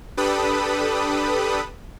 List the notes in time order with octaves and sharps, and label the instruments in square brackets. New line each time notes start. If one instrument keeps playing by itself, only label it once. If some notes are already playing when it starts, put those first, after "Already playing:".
[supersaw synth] D4 G4 A4 B4 B5 D#6